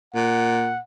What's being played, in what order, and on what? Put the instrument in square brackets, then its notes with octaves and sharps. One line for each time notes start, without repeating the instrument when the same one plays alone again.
[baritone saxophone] A#2 [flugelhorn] F#5